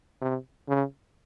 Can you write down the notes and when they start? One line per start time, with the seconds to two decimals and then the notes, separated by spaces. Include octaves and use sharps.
0.21 C3
0.68 C#3